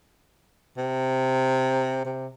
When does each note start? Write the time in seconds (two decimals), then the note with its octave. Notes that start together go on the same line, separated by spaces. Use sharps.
0.77 C3
2.05 C3